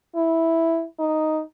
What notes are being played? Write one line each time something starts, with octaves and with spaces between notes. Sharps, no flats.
E4
D#4